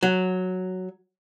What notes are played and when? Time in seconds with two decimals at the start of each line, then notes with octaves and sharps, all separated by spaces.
0.03 F#3